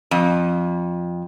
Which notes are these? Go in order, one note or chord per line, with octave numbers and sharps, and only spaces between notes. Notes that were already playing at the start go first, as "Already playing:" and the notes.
F2